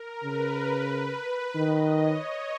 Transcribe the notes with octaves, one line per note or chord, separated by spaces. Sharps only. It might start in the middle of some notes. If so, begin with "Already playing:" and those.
Already playing: A#4
C#3 B4
D#3 D#5
C#5